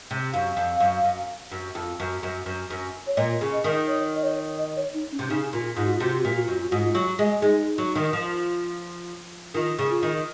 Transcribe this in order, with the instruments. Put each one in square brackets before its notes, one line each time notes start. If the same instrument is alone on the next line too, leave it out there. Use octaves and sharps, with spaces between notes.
[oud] C3
[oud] F#2 [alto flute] F5
[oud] F2
F#2
F#2
F#2
F2
F#2
F#2
F#2
F#2
[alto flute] C#5
[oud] A#2 [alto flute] D#5
[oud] C#3
[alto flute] D#5
[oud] D#3
[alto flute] C#5
D#5
C#5
D#5
C#5
D#4
C#4
[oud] C3
[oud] C#3 [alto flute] D#4
[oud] A#2 [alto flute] F4
[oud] G#2 [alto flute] F4
[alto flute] F#4
F4
[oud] C3 [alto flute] F#4
[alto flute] F4
F#4
[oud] A#2 [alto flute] F4
[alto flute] F#4
F4
[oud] F#2 [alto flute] F#4
[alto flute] F4
F#4
[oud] G#2 [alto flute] F4
[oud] F#3
G#3
[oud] G#3 [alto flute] D#4
[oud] F#3
D#3
F3
[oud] D#3 [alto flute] F4
[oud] C#3
[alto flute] F4
[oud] D#3